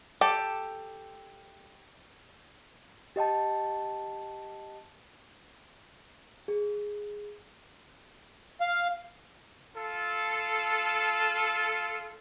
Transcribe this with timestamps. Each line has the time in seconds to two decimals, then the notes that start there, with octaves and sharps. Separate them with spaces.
0.21 G4 A4
3.16 G4 D#5 G5 A5
6.48 G#4
8.61 F5
9.75 F4 A4